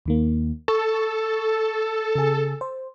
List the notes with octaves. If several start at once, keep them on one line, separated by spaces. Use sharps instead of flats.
D#2 D#3 A#3
A4 C#6
C#3 G#4
C5